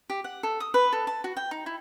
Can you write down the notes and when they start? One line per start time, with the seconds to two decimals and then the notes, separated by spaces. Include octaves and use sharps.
0.10 G4
0.24 F#5
0.43 A4
0.60 D#6
0.74 B4
0.93 A4
1.07 A5
1.24 F#4
1.37 G5
1.51 D#4
1.66 E4